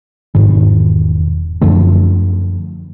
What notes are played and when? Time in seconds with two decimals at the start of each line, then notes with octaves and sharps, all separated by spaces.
0.35 E1 G#2 D#3
1.62 F#2 D3 F3 A3